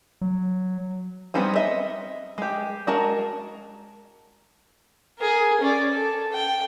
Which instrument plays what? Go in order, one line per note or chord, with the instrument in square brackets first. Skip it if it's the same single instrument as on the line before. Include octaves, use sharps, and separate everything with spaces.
[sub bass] F#3
[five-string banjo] G3 B3 C4 D#4 G#4
D#5 E5
G#3 G4
G#3 F#4 A#4 A5
[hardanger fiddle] G#4 A#4
C#4 D5
A4
G5